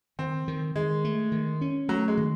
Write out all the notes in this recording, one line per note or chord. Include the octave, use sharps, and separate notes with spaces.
D#3 C4
D#3
D#3 G#3
A3
D#3
C#4
F#3 A3
G#3
D#3